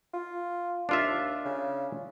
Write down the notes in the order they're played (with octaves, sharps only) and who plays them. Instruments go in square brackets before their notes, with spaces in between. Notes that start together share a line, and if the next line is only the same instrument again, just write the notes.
[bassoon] F4
[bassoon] D#2 [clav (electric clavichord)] D4 F4 E5
[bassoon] C#3